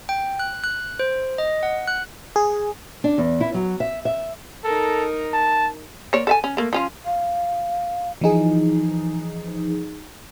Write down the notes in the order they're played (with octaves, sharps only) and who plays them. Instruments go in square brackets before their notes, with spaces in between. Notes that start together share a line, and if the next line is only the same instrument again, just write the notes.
[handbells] G5
F#6
F#6
C5
D#5
F#5
F#6
[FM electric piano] G#4
[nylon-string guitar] D4
E2
E4
F#3
E5
E5
[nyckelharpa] D#4 A#4 [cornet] A4
[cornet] A5
[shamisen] A#3 C#5 D5
A4 E5 G#5
C#4
A3 A#3
F3 C#4 F4
[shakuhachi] F5
[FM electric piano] E3 F3 D#4 G#4